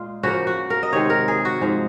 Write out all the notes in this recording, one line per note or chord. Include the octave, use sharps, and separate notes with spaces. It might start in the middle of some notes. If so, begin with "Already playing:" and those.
Already playing: A#2 G#3 F4
C#3 F3 A#3 F#4
F#4
A#4
D#5
C3 D#3 G#3 C#5
A#4
G#4
F#4
G#2 F3 G#3